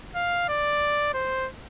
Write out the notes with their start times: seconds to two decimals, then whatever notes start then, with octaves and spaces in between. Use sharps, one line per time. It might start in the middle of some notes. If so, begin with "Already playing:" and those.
0.15 F5
0.49 D5
1.14 C5